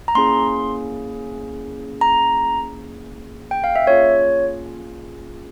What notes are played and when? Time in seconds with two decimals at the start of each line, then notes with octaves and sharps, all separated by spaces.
0.08 A#5
0.15 A#3 C#4 E4 G#4 C6
2.01 A#5
3.51 G5
3.64 F5
3.76 E5
3.87 A#3 C#4 F4 G#4 C#5